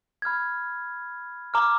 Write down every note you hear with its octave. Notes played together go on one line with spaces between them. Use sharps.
B5 F6 G#6
A#5 D6 F6